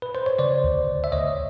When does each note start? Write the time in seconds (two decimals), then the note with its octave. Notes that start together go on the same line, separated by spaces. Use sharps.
0.02 B4
0.15 C5
0.26 C#5
0.39 C#3 C5 D5
0.64 D2
0.88 D2
1.04 E5
1.12 D2 C#5 D#5